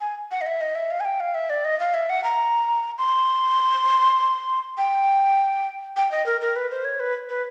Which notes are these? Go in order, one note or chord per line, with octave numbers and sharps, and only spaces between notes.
G#5
F#5
D#5
E5
D#5
E5
F5
G#5
G5
F5
E5
D5
D#5
F5
E5
F#5
A#5
C6
G5
G5
D#5
A#4
A#4
B4
C5
C#5
B4
B4